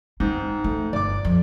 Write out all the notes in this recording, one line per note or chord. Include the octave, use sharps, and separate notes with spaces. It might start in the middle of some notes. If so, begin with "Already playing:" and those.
G#2 D#3 D#4
A3
G1 D5 D6
F2